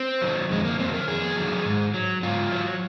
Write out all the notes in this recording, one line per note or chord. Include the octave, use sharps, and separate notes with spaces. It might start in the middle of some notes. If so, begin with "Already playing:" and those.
Already playing: C4
D#3 F#3
F2 G#3
A#3
D#3 F#3 C4
A#4
F2 G#4
D#3 F#3
G#2
F#3
G#2 F4
F#3